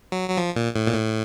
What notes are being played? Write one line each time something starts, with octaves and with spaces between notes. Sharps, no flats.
F#3
F#3
F3
A#2
A2
A#2
A2